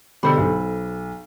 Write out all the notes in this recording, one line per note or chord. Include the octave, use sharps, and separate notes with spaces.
B2 D3 G4 A4 C5 B5
B1